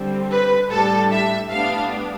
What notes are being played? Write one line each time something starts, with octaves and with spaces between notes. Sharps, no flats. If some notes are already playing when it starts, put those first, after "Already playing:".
Already playing: D3 G3 C4
B4
A2 G3 D4 A4
E5
A2 G3 B3 D4 F5